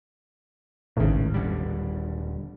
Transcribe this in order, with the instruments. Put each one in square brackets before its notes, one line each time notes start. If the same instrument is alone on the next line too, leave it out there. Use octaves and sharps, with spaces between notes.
[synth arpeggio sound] G#1 A2 [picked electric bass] C#2 C#3
[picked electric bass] D#1 D3 G3